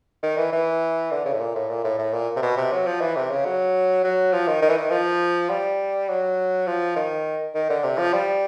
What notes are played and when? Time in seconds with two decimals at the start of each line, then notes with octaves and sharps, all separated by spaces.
0.23 D#3
0.38 E3
0.53 E3
1.11 D3
1.25 C#3
1.33 A2
1.40 A#2
1.55 A2
1.70 A#2
1.84 A2
1.99 A2
2.13 A#2
2.36 C3
2.43 B2
2.57 C3
2.72 F#3
2.87 F3
3.01 E3
3.16 C3
3.31 C#3
3.46 F#3
4.04 F#3
4.33 F3
4.48 D#3
4.62 D#3
4.69 E3
4.77 D#3
4.91 F3
5.50 G3
6.09 F#3
6.67 F3
6.96 D#3
7.55 D#3
7.70 D3
7.84 C3
7.98 F3
8.13 G3